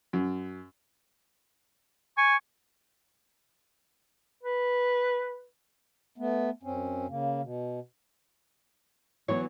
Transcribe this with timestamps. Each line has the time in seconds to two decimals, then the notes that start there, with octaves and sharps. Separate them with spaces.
0.13 F#2
2.18 G#5 C#6
4.43 B4
6.18 A3 B3
6.63 F#2 C4 C#4
7.09 C#3 A#3
7.42 B2
9.28 E3 F#3 B3 C#5